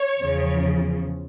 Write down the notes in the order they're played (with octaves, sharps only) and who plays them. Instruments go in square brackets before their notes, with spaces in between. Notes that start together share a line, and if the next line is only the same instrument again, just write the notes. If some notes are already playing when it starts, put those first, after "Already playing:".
Already playing: [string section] C#5
E2 C#3 F3